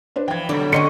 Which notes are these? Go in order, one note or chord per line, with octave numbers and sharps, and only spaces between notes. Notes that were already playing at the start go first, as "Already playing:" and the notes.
D4 B4 C5
E3 F3 G5 G#6
B2 D3 F#3 G3 A4 D5
D3 F#3 A#3 C#4 D#5 C6 C#7